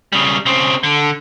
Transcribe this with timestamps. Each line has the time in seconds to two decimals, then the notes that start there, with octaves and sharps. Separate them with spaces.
0.12 C#3 G3
0.46 C#3 C4
0.83 D3